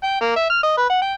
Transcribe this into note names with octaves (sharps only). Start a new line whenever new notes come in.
G5
A#3
E5
F6
D#5
B4
F#5
G5